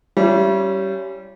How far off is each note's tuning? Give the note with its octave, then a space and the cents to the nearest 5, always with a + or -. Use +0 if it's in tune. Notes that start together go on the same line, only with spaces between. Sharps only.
G3 -20 C#4 +0 E4 +35